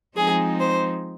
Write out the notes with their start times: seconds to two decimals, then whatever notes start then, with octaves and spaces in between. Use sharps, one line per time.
0.16 F3 G#3 C4 D#4 G#4
0.60 C5